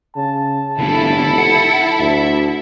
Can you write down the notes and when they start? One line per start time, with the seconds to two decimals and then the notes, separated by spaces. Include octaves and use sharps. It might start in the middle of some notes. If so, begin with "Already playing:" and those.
0.16 C#3 A5
0.79 F1 D3 B3 E4 A4
1.38 F#5
2.00 D2 E5